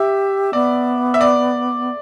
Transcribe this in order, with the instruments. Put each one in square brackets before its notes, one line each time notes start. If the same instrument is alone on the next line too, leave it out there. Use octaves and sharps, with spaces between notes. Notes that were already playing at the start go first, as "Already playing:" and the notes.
Already playing: [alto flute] G4 [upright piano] E5
[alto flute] B3 [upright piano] D5
[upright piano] E5
D5